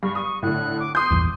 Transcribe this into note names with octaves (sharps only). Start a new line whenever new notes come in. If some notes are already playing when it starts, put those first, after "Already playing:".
G2 C#6
C#6 D#6
A2 D3 F#6
D6
C6 D6 D#6 G6
A#1 E2 G2